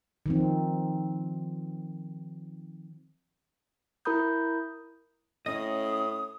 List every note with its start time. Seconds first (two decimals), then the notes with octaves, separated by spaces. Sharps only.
0.26 D#3 F3 C4
4.05 E4 A#4 A#5 B5 D#6 G6
5.46 A2 C#4 D#5 D#6